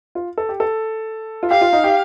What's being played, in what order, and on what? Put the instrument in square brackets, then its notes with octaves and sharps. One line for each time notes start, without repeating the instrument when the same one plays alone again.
[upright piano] F4
A4
G4
A4
F4
[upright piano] G4 [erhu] F5
[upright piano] F4
D#4
G4